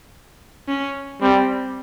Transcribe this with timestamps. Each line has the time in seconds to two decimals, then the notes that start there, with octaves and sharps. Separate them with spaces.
0.68 C#4
1.21 G3 C4